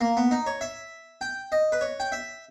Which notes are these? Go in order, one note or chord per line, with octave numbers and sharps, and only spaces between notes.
A#3
B3
D#4
C#5
E5
G5
D#5
B4
C#5
G5
E5